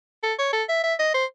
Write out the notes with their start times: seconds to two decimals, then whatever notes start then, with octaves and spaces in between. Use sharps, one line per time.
0.23 A4
0.39 C#5
0.53 A4
0.69 E5
0.84 E5
0.99 D#5
1.14 C5